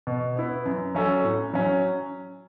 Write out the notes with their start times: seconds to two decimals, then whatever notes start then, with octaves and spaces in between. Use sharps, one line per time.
0.07 B2
0.36 B3 E4
0.66 F#2
0.95 F#3 C#4 A4
1.24 A2
1.53 F#3 C#4